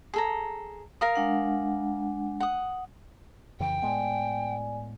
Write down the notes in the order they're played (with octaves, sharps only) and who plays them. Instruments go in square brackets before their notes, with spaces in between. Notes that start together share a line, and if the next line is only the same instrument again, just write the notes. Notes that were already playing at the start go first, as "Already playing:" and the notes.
[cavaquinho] G#4 A4 A#5
A#4 F5 D#6
[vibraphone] G#3 D4 F#5
[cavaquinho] F#5 D#6
[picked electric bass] F2 C#3 E3 [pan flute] G5
[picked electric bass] A2 G#3 B3 [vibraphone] D5 G#5